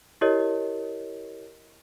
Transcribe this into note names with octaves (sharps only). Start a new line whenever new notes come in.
E4 G4 A#4 C#5 D#5